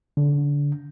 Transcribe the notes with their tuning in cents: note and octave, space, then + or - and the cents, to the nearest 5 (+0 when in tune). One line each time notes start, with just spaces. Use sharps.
D3 -25